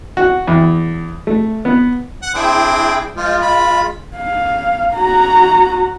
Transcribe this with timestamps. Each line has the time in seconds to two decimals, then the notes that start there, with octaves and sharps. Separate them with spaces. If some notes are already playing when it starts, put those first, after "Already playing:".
0.17 F#4
0.47 E2
1.27 A3
1.65 B3
2.22 F#5
2.35 C4 D4 E4 G#4 G5
3.16 F3 G#3 F4
3.42 B5
4.17 F5
4.94 F#4 A#5